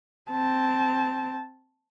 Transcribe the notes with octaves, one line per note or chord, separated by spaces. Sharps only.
C4 A5